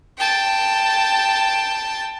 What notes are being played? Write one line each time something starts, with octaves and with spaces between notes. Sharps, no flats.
G5 A5